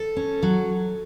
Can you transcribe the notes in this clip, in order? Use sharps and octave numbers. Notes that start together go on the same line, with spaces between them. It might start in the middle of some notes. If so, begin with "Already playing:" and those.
Already playing: A4
C#4
F#3